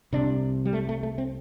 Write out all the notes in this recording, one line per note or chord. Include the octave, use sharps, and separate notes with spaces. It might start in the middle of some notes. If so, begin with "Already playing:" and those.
C2 C3 D4
G3
A3
A3
A3
C4